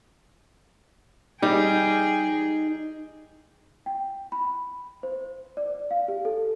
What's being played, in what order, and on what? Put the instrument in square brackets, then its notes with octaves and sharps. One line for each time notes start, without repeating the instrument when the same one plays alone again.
[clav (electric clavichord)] G3 [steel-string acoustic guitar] D#4 [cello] G#4 G5
[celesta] G5
B5
C5
D5
F5
G4
A4